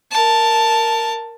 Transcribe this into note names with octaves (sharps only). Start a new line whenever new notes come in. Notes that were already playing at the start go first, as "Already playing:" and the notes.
A#4 A5